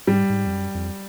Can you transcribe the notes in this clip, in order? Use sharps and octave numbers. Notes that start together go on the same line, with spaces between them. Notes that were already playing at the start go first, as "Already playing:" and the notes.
G#2 G3
G#2
F2
F#2
F2